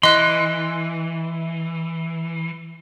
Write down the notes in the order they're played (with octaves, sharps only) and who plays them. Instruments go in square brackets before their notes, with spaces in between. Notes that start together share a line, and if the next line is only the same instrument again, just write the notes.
[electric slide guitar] E3 [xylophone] D#5 F#6 [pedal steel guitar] C6